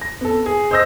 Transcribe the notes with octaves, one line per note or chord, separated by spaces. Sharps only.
A#6
B3 A4
G#4
C5 D#5 D#6 E6 G6 A#6